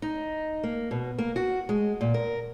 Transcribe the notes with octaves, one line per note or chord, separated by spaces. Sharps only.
D#4
A#3
B2
A#3
F#4
G#3
A#2
A#4